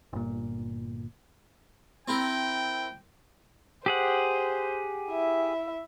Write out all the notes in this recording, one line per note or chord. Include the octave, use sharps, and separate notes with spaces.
G1 A#2
C4 E4 A#4 G5
G4 G#4 C5 F#5
E4 E5